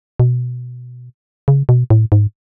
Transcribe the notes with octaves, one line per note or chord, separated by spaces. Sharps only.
B2
C#3
B2
A2
G#2